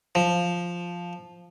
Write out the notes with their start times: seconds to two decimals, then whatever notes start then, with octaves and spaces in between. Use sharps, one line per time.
0.15 F3